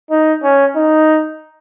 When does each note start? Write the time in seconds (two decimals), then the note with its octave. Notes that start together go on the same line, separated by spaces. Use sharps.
0.11 D#4
0.43 C#4
0.76 D#4